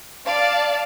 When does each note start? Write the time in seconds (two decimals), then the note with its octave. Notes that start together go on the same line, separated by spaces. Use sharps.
0.23 D5 F5 A5